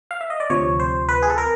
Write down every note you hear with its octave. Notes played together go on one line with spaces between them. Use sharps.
F5
E5
D#5
D5
D2 C3 F3 C#5
C5
B4
G#4
A4
A#4